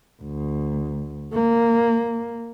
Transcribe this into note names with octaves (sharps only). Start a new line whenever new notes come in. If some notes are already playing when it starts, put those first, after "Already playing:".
D2
A#3